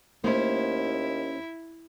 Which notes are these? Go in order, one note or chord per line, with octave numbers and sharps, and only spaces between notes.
D#2 A3 A#3 C#4 E4 C5